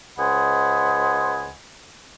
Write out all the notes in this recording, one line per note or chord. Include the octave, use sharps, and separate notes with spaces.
C#2 C5 D#5 F#5 G#5 B5